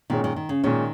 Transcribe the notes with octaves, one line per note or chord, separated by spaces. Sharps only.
A#2 D#3 G#3 C#4
D#3
D#3
C#3
A#2 D#3 G#3 C#4